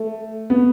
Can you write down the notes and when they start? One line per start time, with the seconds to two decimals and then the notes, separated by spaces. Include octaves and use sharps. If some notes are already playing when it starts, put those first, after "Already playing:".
Already playing: A3
0.50 B3